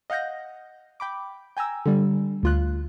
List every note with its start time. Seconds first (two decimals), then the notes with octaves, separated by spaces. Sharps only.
0.10 D#5 F5 F#5 G6 A#6
1.00 G5 B5 D6
1.57 G5 G#5 A#5 E6
1.86 D3 G3
2.43 D2 F4 F#6